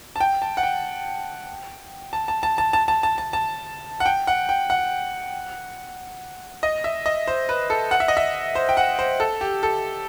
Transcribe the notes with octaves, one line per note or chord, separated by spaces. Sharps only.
A5
G5
A5
F#5
G5
A5
A5
A5
A5
A5
A5
A5
A5
A5
F#5
G5
F#5
G5
F#5
D#5
E5
D#5
C5
B4
A4
F#5
E5
D#5
E5
C5
G5
F#5
C5
A4
G4
A4